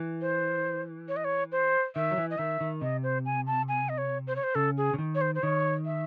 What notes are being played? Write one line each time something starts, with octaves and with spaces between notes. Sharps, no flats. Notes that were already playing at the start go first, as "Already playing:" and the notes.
Already playing: E3
C5
C#5
D#5
C#5
C5
D#3 E5
F#3
E3
D#5
D#3 E5
D#3
C3 D#5
C5
G#5
A5
G#5
D#5
C#5
C5
C#5
C5
C#3 A4
G#4
C#3
D#3
C#5
C5
C5
D#3 C#5
E5